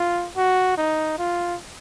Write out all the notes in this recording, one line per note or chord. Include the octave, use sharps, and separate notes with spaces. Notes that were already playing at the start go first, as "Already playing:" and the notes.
Already playing: F4
F#4
D#4
F4